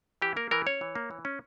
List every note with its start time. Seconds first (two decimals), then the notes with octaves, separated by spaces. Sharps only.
0.22 E3 G4
0.36 A#3 A#4
0.51 E3 A#4
0.67 C#4 C#5
0.81 E3
0.95 A#3
1.11 E3
1.25 C#4